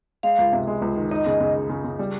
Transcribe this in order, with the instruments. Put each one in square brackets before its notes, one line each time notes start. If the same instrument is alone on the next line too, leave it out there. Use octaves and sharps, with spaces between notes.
[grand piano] G#3 [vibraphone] F5
[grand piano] C#2
C3
G#3
C#2
D#3
[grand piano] D#4 [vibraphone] D#5
[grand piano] C#3
C#3
G#3
C#3
C#3
G3